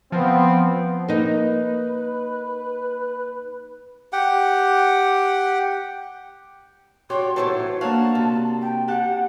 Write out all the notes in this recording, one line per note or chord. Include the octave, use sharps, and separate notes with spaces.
F3 B3 C4
A#3 D#4 B4
G4 F#5 G5
F#4 G4 C#5 D5 C6
A2 E3 F#3 C5 C#5 A5 C#6
A#3 D4 F#4 F5 A5
C3
G5
G4 F#5 A5 F#6